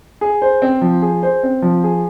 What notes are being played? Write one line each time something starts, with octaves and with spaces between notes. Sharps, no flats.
G#4
C5
C4
F3
G#4
C5
C4
F3
G#4